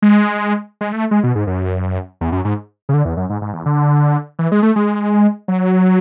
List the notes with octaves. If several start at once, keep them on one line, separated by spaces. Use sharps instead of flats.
G#3
G#3
A3
G#3
B2
G#2
F#2
E2
F#2
G#2
C#3
D3
E2
F#2
G#2
G#2
E2
D3
E3
G#3
A3
G#3
F#3